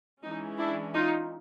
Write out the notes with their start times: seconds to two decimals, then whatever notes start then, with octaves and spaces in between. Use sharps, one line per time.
0.22 E3 G#3 C#4 D#4
0.59 D4 E4
0.95 D#4 F4